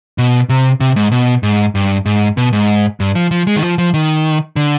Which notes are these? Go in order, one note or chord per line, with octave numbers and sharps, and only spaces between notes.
B2
C3
C3
G#2
B2
G#2
G2
G#2
B2
G#2
G2
F3
F3
G#3
D#3
F3
F3
D#3
D3